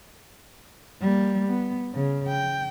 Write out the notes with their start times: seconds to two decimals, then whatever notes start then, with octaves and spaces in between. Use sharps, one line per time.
1.01 G3 A#3
1.48 B3
1.93 C#3
2.28 G5